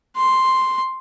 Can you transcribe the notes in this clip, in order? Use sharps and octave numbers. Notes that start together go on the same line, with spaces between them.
C6